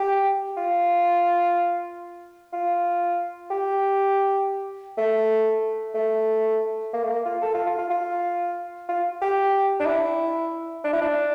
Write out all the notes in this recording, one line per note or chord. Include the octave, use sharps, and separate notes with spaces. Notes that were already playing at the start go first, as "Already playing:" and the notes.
Already playing: G4
F4
F4
G4
A3
A3
A#3
A3
A#3
F4
A4
F4
F4
F4
F4
F4
G4
D4
E4
D4
E4
D4